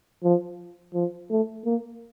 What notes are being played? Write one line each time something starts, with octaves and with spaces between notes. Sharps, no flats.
F3
F3
A3
A#3